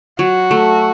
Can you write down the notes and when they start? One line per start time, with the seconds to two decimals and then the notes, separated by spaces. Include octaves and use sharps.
0.19 F#3 F#4
0.51 A3